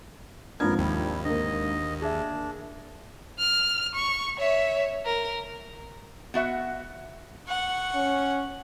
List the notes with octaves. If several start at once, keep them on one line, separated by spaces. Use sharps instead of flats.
G#1 F3 B3 C4 D4 A#4 G#6
D#2 G3 E4
D2 A#3 D#5
D4 G#4 E5
F6
C#6
C#5 E5
A#4
B3 F#4 E5 F#5
F#5 C#6
C#4